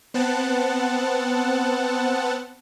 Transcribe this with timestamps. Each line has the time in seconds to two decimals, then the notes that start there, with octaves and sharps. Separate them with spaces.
0.14 B3 C4 F#5 A5